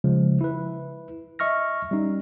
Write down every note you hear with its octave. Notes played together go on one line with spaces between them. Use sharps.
C#3 F3 G#3
E4 B4
D#5 E5 C#6 F6 A#6
G3 C#4 D#4